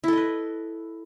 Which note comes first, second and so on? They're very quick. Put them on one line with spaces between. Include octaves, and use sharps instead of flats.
E4 A4 D#5 B4